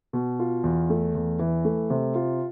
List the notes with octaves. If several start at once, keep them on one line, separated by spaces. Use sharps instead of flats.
B2
F4
E2
A3
E2
E3
A3
C3
F4